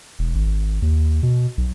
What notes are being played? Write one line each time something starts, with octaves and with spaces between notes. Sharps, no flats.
E1
G#1
D#2
B2
B1